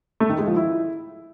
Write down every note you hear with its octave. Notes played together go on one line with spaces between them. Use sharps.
A3
D#3
G#3
F3
E4